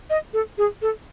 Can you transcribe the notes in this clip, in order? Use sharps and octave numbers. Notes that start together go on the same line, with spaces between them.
D#5
A4
G#4
A4